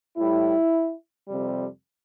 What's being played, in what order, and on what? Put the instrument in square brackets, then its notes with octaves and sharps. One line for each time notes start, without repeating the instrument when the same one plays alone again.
[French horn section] A2 G3 E4
F2 C3 G3